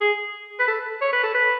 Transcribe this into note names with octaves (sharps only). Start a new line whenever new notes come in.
G#4
B4
A4
C#5
B4
A4
B4